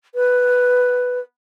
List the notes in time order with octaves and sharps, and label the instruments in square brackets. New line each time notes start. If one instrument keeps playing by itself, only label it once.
[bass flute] B4